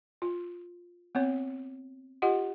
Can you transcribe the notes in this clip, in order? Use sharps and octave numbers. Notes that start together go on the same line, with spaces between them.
F4
B3 C4 C#5
F4 G4 D#5 F#5